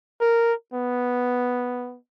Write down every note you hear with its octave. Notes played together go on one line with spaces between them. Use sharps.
A#4
B3